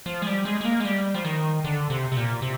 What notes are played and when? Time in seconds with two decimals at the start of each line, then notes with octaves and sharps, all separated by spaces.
0.06 F3
0.22 G#3
0.27 G3
0.45 G#3
0.61 G#3
0.65 A#3
0.80 G#3
0.85 G3
1.14 F3
1.25 D#3
1.64 D3
1.90 C3
2.12 C3
2.17 A#2
2.42 C3